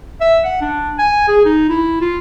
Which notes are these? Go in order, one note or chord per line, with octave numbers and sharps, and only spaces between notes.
E5
F#5
D4
G#5
G#4
D#4
E4
F4